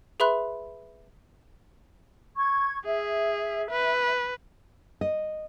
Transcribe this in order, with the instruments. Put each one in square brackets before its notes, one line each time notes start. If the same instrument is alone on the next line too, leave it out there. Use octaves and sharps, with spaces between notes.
[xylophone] G#4 B4 E5 B5 C6 F#6
[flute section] C#6 G#6
[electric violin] G#4 [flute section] E5
[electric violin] B4
[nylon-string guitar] D#5